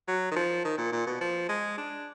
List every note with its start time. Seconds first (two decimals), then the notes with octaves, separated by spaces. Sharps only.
0.08 F#3
0.31 D#3
0.36 F3
0.65 D#3
0.78 A#2
0.92 A#2
1.07 B2
1.21 F3
1.49 G#3
1.78 D4